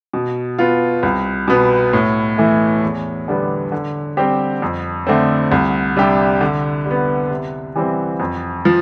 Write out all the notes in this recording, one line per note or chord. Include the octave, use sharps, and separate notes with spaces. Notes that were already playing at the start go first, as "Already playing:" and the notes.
B2
B3 F4
C2
B2 B3
A2
E3 A3 E4
E2
D3 G3 B3 D4
D3
G3 C4 G4
F2
D3 A3 C4
C2
C3 G3 D4 G4
D3
G3 B3
C3
E3 G3 C4
F2
F3